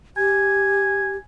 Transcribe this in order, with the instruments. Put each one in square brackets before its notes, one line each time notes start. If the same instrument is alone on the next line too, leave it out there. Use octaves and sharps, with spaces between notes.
[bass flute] G4 [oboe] G#5